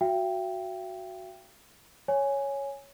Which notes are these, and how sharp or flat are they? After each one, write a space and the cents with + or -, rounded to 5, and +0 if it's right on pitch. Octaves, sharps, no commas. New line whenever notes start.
F#4 +0 E5 +45 G5 +0
C#5 +0 G#5 +0